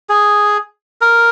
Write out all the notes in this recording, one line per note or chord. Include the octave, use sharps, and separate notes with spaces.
G#4
A#4